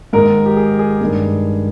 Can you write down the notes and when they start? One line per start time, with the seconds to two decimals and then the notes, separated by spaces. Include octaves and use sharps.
0.13 G#2 D#3 G#3 A#4
0.46 G4
0.56 G#4
0.79 G#4
1.01 G2 D#3 G#3